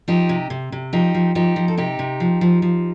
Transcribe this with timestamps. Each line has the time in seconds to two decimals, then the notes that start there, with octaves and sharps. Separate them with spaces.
0.08 F3 D#4 G4
0.29 C3
0.50 C3
0.72 C3
0.93 F3 D#4 G4
1.15 F3
1.35 F3 D#4 G4
1.56 F3
1.68 A4
1.77 C3 D#4 G4
1.99 C3
2.20 F3
2.41 F3
2.62 F3